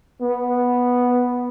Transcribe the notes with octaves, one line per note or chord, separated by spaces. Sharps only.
B3